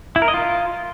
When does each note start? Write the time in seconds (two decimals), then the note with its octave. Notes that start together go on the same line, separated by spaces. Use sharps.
0.16 E4
0.22 A#4
0.28 D#5
0.34 F4